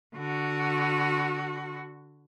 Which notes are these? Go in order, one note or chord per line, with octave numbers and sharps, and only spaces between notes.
D3 F#4